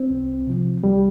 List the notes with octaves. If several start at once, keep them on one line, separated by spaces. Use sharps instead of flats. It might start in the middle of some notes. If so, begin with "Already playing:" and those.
Already playing: C4
C2
C3 F3
C2 G3